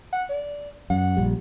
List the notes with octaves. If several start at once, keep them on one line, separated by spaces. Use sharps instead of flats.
F#5
D5
F#2 F#5
A#1 G3